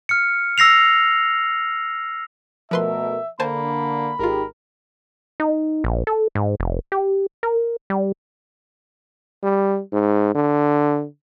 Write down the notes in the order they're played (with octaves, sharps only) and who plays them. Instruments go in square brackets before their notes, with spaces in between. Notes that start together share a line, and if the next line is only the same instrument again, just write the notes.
[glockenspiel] F6 C#7
E6 A#6 C7 F7
[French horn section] B2 A3 A#4 [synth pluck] F3 B4 C6 [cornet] E5
[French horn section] D3 [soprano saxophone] A#3 [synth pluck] C5 G#5 A5 [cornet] B5
[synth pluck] G#1 F4 [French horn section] D#4 G4 G#4 [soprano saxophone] A#4
[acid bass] D#4
A#1
A4
G#2
F1
G4
A#4
G3
[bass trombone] G3
G#2
D3